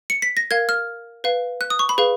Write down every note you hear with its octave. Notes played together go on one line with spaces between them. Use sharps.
C#7
B6
A#6
A#4 F5 G#6
F6
B4 F5
F#6
D#6
C#6
B5
G#4 B4 F5